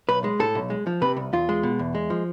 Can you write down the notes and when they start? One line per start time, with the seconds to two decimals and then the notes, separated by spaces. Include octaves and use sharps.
0.09 B1 B4
0.24 G#3
0.39 A2 A4
0.55 B1
0.70 G#3
0.87 F3
1.01 C3 B4
1.17 C2
1.33 E2 F4
1.49 G#3
1.63 B2
1.79 E2
1.95 G#3
2.10 F3